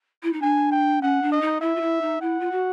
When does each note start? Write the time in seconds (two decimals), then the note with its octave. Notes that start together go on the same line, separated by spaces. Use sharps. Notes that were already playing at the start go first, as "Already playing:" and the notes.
0.23 E4
0.33 D#4
0.42 D4 G#5
0.72 G5
1.02 C#4 F#5
1.22 D4
1.32 D#5
1.41 D#4
1.61 E4 E5
1.76 F4
1.81 E4
2.01 D#4
2.21 E4 F#5
2.40 F4
2.52 F#4